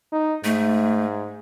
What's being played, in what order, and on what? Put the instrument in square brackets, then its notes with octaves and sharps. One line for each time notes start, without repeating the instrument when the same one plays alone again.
[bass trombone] D#4
[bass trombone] G#2 [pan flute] A3